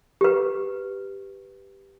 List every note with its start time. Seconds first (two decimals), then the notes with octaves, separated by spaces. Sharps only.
0.21 G4 B4